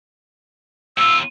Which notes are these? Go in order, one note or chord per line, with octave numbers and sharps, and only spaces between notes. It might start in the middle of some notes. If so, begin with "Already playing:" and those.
D#2 F4 E6